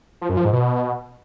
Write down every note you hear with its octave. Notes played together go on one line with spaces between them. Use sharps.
F3
F#2
F3
G#2
B2